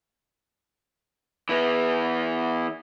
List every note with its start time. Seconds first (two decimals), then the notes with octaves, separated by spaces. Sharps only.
1.49 E3 B3